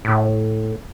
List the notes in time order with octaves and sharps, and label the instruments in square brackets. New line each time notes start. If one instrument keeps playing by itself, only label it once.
[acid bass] A2